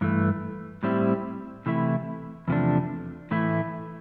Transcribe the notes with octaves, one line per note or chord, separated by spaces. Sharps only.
G2 E3 A3
A2 G3 C4 E4
C3 E3 A3 E4
E2 C3 F3 A3 D4
A2 E3 A3 E4